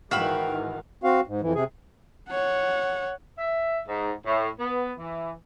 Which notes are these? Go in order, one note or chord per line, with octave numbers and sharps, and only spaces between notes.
G#2 D#3 E3 F#4 E5 F5 G5 B5
C4 F#4 F5
G#2
F2 E3
C3 G#4
C#5 F#5
E5
G#2
A2
B3
E3